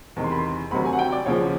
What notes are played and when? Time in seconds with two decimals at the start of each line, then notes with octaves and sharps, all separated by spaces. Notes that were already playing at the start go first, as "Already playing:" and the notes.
0.16 E2 C3 D#3
0.24 C6
0.31 B5
0.38 C6
0.71 D2 C3 D#3 F#3 B5
0.85 G#5
0.93 F#5
0.99 G5
1.12 D5
1.26 D#2 C#3 F3 C#5